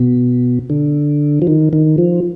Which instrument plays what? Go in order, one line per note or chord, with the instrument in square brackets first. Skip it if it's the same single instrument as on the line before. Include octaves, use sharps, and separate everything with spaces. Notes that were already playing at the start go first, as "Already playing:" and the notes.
Already playing: [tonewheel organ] B2
D3
F3
D#3
D#3
F3